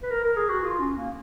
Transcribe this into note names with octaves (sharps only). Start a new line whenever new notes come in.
B4
A#4
A#4
G#4
F#4
F4
C#4
A#3